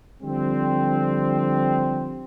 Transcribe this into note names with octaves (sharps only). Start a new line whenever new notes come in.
D3 F3 G3 C4